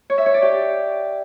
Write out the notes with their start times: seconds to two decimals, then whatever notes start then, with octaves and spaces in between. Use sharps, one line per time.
0.10 C#5
0.18 E5
0.26 C#5
0.34 D5
0.42 G4